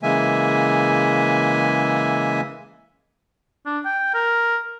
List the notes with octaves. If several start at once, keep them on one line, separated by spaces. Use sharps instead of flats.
C#3 E3 G#3 A#3 E5 G#5
D4
G5
A#4